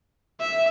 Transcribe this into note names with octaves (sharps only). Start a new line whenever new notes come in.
E5